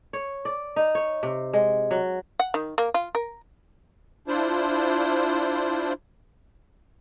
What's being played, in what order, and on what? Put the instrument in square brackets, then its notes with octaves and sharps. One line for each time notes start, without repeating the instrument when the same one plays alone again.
[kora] C#5
D5
D#4
C#5
C3
G#3
F#3
[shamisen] F#5
D#3
A#3
F4
A#4
[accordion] D4 E4 F4 C5